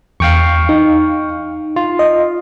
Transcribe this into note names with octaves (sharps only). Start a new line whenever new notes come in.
E2 F5 G5 C#6
D#4
F4
D#5